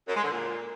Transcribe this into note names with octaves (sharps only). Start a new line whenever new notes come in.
F#2
G#3
D3
A#2